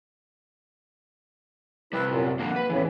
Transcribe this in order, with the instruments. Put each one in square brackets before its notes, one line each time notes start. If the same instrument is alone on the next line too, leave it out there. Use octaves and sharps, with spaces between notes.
[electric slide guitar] C3 G3 [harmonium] E4 B4
[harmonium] F#2 A#2
[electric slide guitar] D3 F3 A#3 [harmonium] F#5
[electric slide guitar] B4
[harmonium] E2 A2 C#3 [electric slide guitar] E3